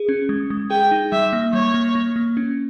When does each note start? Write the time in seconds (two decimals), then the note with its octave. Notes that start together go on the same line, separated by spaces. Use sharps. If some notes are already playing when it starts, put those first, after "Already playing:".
Already playing: G#4
0.09 C#4
0.29 G#3
0.50 G#3
0.70 G#4 G5
0.91 D#4
1.12 G3 E5
1.33 A#3
1.53 G3 C#5
1.74 A#3
1.95 A#3
2.16 A#3
2.37 C#4